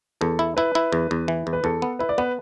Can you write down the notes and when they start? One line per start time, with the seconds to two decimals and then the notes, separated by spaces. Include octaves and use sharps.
0.21 E2 A4
0.39 E4
0.57 E4 B4
0.75 E4
0.93 E2
1.11 E2
1.28 E3
1.47 E2
1.53 B4
1.64 E2 A4
1.82 B3
1.99 E4 B4
2.09 D5
2.18 B3 B4